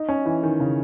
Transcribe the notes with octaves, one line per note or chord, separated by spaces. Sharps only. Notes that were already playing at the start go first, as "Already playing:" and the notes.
Already playing: D#4
C#4
E3
D#3
C#3